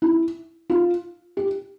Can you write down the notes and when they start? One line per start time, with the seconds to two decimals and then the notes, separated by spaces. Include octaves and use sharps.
0.02 E4
0.70 F4
1.37 G4